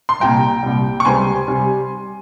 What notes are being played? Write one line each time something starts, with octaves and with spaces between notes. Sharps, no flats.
C6
C2 A#2 G3 G5 A#5
C2 A#2 G3
C#6
C#2 C3 G3 C4 G#5 C6
C3 G3